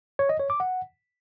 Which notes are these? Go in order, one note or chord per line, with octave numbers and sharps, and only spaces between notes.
C#5
D#5
C#5
D6
F#5